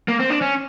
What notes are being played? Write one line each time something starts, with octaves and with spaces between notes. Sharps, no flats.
A#3
C4
D4
C#4